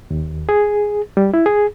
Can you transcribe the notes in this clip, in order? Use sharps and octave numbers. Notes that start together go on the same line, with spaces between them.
D#2
G#4
G3
E4
G#4